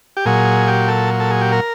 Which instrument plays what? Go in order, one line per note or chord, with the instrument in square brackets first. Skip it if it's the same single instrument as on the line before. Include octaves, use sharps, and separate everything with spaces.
[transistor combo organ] G4
A#2 F#3 G#4
G4
A4
A4
G#4
G4
A#4